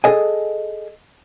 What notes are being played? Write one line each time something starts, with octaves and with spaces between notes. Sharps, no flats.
G#4 A4 D#5 G#5